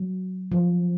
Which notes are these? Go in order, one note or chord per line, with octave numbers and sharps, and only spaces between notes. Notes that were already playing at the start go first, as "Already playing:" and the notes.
Already playing: F#3
F3